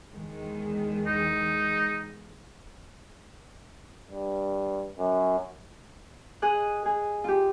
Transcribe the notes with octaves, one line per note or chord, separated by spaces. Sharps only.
E2 D#3 G#3
D#4
G2
F#2
G#4 D#5 F#6
G#4
F4 G4